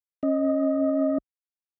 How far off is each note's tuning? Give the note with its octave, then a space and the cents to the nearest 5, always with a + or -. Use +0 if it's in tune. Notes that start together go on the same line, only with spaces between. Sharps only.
C#4 -25 D#5 +5